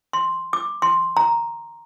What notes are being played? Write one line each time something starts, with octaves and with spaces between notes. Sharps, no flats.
C6
D6
C6
A#5